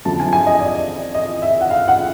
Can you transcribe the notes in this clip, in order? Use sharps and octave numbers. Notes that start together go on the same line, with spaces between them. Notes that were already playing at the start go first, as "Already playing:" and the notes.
F2 D3 F#3 A5
G#5
G#5
D#5
D5
D#5
E5
F#5
F5
F#5